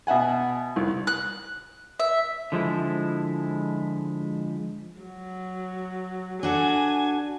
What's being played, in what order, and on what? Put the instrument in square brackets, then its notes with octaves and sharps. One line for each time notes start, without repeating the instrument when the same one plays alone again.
[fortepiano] B2 E5 F#5 G#5
C2
[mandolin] F#6
E5
[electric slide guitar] D3 F3 G#3 E4
[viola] F#3
[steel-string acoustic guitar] D4 F#4 A4 [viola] G#5